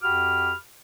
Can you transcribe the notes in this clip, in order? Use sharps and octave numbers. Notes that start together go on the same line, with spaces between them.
F2 F#4 G4 B5 D6 F6